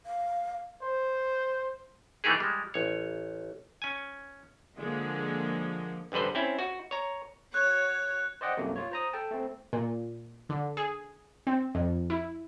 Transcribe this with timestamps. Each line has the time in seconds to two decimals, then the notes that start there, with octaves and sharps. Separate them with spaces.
0.06 F5
0.82 C5
2.24 E3 A3 A#3 D#4 G4 G#4
2.40 G3 G#3
2.74 A1 C#5
3.82 C#4 G#5
4.78 D3 F3 G#3 A#3
6.12 A1 G2 D3 B4 C5
6.35 C4 C#4 E4
6.59 F#4
6.91 C#5 A#5
7.54 F#4 C#5 F#6
8.41 C5 D5 D#5 F#5 G5
8.57 C2 F#2 C3 A3 A#3
8.76 F4 C#5
8.92 C5 A#5 D#6
9.13 A4 G5 A5
9.31 A3 C4
9.73 A#2
10.49 D3
10.77 G#4
11.47 C4
11.75 F2
12.10 E4